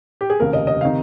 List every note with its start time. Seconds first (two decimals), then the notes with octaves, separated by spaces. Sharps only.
0.21 G4
0.30 G#4
0.40 F1 D#2 C#3 A#4
0.53 D#5
0.67 D#5
0.81 C3 D#3 F5